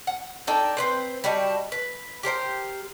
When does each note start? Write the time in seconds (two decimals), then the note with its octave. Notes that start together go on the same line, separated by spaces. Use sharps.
0.07 F#5
0.47 D4 D#4 A4 G5
0.77 C4 B4 C5
1.24 G3 D4 F#4 D#5
1.72 B4
2.23 G4 A#4 C5 G5